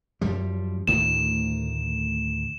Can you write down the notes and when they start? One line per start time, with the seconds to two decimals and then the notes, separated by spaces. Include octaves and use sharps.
0.21 F#2 F3 G3
0.87 D2 A2 D#3 E7